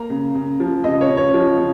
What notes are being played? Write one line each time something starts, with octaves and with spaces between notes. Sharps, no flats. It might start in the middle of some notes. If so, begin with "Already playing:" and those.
Already playing: A#3 A#5
C#3
C#3
F3
C#3 D#5
C#5
C#3
C#5
F3
C#3